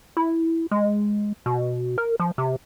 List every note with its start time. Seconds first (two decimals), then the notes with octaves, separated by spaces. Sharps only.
0.17 E4
0.71 G#3
1.46 B2
1.98 A#4
2.20 F3
2.38 C3